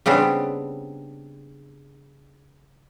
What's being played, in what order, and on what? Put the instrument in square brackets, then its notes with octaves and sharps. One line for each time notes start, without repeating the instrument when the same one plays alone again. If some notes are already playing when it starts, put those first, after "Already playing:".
[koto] C#3 G3 B3 C4 D4